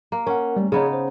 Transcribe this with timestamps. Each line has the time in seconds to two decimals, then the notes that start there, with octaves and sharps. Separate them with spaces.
0.12 A#3
0.27 C#4 A#4 F#5
0.56 G3 A3
0.72 C#3 B3 D#4 G#4 C#5
0.93 C5